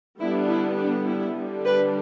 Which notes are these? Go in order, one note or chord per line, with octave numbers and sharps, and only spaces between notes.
D3 G3 B3 D4 E4
E4
D4
E4
D3 G3 D4
G4 B4